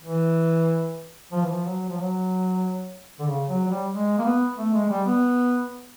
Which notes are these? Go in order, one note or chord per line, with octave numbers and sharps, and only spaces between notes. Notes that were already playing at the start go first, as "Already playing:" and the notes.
E3
F3
E3
F3
F#3
F3
F#3
D3
C#3
F#3
F#3
G3
G#3
A#3
B3
A3
G#3
G3
B3